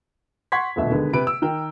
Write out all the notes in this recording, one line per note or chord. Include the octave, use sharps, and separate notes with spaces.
F#5 C6 C#6 G#6 B6
D#1 D2 B2 E5
D3 D#3 G#3 B3
C3 B4 D7
E6
D#3 A#4 G5